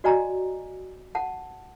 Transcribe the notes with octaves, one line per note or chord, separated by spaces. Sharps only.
F#4 D5 D#5 G#5 A#5
F#5 A5